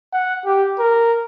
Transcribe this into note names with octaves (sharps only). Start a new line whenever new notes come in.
F#5
G4
A#4